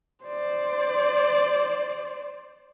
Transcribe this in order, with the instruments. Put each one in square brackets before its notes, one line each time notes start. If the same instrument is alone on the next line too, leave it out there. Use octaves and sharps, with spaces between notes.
[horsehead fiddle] C5 D5